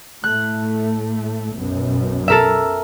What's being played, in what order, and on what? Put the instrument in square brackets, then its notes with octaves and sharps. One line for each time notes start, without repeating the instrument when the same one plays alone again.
[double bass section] A2 A3 [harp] F#6
[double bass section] B1 F#2 B2
[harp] A4 A#4 E5